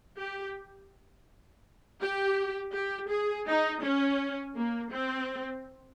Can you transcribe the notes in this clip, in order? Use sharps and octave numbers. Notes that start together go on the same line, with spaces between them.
G4
G4
G4
G#4
D#4
C#4
A#3
C4